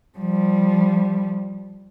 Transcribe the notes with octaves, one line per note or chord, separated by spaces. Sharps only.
F3 G3